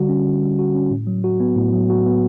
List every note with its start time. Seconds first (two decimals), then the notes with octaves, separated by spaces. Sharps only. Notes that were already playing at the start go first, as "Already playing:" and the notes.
Already playing: D3 G3 F#4
0.09 C#4
0.26 D3
0.42 G3
0.59 F#4
0.75 C#4
0.91 A2
1.07 F#3
1.24 F#4
1.40 B3
1.56 A2
1.73 F#3
1.90 F#4
2.06 B3